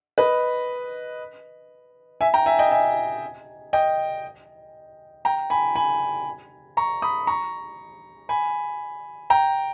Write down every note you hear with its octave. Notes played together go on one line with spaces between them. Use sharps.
B4 D#5
E5 G#5
G5 A#5
E5 G#5
D#5 G5
E5 G#5
D#5 G5
G5 A#5
G#5 B5
G#5 B5
A#5 C#6
B5 D#6
A#5 C#6
G#5 B5
G5 A#5